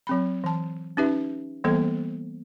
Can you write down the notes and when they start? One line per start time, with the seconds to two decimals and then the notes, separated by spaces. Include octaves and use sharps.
0.07 F#3 C4 B5
0.44 E3 A5
0.97 C#4 D#4 G4 B4 E5
1.64 E3 G3 A#3 B3 A4 C5